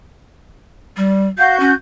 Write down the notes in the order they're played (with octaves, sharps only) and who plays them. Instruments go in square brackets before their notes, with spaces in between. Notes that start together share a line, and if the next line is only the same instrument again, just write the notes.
[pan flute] G3
[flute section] F#4 G6 [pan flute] F5
[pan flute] C#4